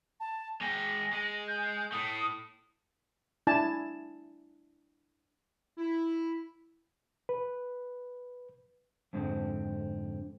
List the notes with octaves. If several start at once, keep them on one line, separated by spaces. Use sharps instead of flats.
A5
G#3 G5 A#6
G#3
G6
A2 A3 D#6
D4 E4 G#5 A5
E4
B4
F2 G#2 D3 C4